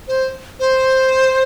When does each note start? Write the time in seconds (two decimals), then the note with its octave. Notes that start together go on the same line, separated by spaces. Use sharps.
0.08 C5
0.60 C5